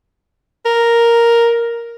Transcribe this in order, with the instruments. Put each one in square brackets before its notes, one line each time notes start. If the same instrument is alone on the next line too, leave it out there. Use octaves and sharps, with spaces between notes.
[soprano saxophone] A#4